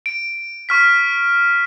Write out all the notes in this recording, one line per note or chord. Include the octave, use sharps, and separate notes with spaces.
D7
C#6 F6 B6